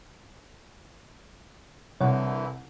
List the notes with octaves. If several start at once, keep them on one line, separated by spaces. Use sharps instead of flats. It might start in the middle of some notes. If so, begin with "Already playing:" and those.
C2 D3 E3 E4 C#5 F#5